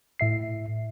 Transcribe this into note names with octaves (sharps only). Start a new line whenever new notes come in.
A2 E5 C7